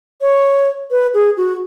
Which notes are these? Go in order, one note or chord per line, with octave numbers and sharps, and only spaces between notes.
C#5
B4
G#4
F#4